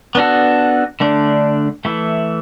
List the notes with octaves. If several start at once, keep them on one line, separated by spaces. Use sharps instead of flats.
B3 D4 F#4 A4
D3 A3 D4
E3 A3 E4